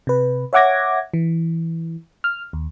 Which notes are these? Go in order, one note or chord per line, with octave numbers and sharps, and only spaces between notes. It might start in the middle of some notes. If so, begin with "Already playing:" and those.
C3 B4
C#5 E5 F#5 D6 G#6 A#6
E3
F6
D#2